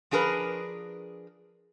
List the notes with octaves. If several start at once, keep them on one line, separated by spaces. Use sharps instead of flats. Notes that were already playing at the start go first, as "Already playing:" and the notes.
F3 D4 G#4 A#4 B4